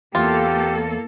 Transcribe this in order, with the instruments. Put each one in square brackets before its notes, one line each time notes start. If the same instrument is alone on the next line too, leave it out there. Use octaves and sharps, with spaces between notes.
[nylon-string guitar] E2 [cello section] A#3 A4 [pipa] F4 [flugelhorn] G4